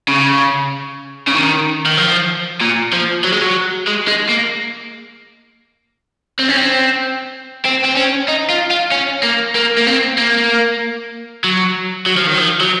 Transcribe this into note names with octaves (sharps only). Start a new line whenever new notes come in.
C#3
C#3
D#3
D#3
F3
A#2
F3
F#3
G#3
F#3
G#3
G#3
A#3
C4
C#4
C4
C4
C4
C#4
D#4
F4
F4
C#4
A#3
A#3
A#3
C4
A#3
F#3
F#3
F3
D#3
F3
F#3